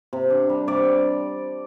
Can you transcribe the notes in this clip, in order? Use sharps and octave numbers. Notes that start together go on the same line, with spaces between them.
C3
D4
G3
C3 D5